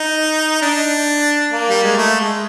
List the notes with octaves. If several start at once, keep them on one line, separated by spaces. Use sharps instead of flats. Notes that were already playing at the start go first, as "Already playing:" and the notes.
Already playing: D#4
D4
A#3
G3
G#3
A3
G#3